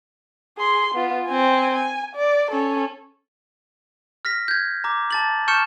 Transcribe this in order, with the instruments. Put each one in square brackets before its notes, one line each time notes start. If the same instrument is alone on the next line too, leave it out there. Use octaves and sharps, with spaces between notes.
[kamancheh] G#4 C6
B3 F4
C4 G#5
G#5
D5
C#4 A4
[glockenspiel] F6 A#6 B6
G6 G#6
A#5 D6
A5 A6 F#7
A5 C#6 F6 G6 C#7 E7